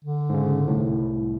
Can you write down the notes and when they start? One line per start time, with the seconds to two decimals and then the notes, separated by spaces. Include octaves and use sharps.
0.04 D3
0.29 G#2 C#3
0.67 C2 A2